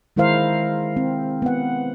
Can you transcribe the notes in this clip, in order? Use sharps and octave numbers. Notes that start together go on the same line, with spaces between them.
D#3 G#3 E4 A#4 C5 F5
C4
B3 F#5